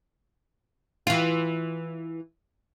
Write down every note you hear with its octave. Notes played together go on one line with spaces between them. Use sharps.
E3 F4